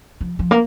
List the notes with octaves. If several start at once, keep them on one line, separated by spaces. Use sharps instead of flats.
F3
F3
A#3